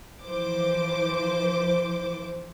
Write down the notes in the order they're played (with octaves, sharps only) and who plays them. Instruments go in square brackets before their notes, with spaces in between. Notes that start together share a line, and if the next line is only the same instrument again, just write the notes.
[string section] E3 F3 C5 D6